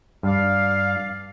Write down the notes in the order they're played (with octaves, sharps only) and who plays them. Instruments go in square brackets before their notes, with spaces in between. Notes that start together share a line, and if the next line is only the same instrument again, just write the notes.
[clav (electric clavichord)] G2 [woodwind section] D5 F5